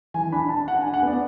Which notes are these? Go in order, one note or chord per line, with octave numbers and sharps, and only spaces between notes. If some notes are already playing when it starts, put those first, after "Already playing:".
E3 G#5
D4 B5
D4 A5
D4 F#5
D4 G#5
F#5
B3 D5